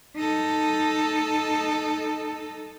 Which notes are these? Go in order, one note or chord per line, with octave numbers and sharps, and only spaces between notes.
D#4 A4